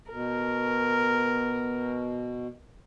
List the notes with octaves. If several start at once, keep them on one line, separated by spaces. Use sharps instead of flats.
B2 A#4